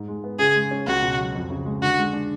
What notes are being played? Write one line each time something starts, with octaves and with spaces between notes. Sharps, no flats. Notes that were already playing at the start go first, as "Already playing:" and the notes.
Already playing: G#2
G#3
B3
C#3 G#4
G#3
C#4
C#2 F#4
B2
F#3
F2
C#3
G#3
D3 F#4
G#3
D4